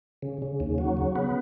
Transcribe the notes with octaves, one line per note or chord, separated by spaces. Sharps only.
C#3
C#3
D#2
F#3
C#3
B3